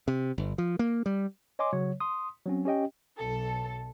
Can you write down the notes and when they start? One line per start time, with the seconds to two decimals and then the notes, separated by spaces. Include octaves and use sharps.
0.08 C3
0.38 G1
0.58 F3
0.79 A#3
1.06 G3
1.59 C#5 D#5 G#5 C6 D6
1.73 C#3 F#3 C#5
2.00 C6 D#6
2.46 F#3 C4 C#4
2.65 C#4 G4 D#5 G5
3.19 B1 A4